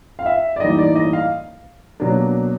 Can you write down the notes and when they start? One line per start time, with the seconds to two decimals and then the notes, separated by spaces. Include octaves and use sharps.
0.19 F5
0.26 E5
0.56 D5
0.60 A2 E3 G3 A#3 D#4 D#5
0.78 D5
0.96 D#5
1.13 F5
2.00 B2 F#3 A#3 D4